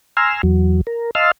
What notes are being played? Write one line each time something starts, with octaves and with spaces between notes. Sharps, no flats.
G#5 A#5 C6 E6 F6
E2 F#3
A#4
D#5 F5 A5 C6 E6 F6